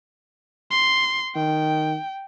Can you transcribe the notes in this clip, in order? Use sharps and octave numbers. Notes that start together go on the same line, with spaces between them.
C6
D#3 G5